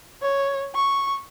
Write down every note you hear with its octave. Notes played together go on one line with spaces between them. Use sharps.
C#5
C#6